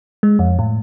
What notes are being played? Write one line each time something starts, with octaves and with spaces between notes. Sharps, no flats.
G#3
F2
A2